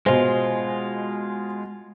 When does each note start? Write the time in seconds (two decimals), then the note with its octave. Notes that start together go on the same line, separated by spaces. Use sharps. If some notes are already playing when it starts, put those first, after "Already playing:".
0.06 B2 G#3 F4 C5 D#5 G#5